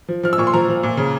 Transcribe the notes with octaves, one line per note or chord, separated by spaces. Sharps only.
F3
F3 F6
E6
A#2 C#6
C6
F3 A#5
F3
A#2
C#3